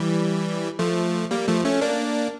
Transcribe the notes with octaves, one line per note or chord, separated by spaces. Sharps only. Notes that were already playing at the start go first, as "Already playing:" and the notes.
Already playing: E3 G3
F3 A3
G3 A#3
F3 A3
A3 C#4
A#3 D4